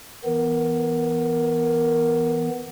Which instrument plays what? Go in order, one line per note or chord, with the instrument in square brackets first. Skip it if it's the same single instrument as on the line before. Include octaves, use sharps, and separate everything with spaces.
[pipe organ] E3 B3 [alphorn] A#4